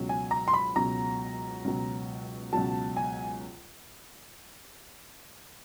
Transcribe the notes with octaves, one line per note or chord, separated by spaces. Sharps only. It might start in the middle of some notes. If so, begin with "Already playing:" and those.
Already playing: C#2 B2 F#3
G#5
A#5
C6
B5
C#2 B2 F#3 A#5
C#2 B2 F#3
C#2 B2 F#3 A5
G#5